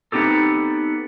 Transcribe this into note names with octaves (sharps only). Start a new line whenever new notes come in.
B3 C4 D#4 G4 A4